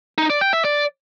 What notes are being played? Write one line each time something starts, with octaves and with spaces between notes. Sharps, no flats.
D#4
D5
G5
E5
D5